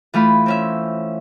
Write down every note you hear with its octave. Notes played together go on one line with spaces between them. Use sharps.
E3 A3 F4 B5
C4 C#4 E5